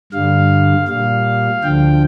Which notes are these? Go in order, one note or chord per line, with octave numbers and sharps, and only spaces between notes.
G2 D3 G3 F5
A#2 G3 F5
D2 D3 F3 G5